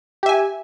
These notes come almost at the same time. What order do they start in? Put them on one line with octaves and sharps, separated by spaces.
G4 E5 G#5